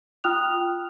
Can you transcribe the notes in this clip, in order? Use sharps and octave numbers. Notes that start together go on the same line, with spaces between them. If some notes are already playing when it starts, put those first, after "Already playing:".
F4 G5 D#6 F6 F#6 F7